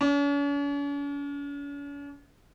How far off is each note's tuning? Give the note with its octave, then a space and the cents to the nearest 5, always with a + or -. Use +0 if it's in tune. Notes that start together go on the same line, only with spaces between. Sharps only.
C#4 +45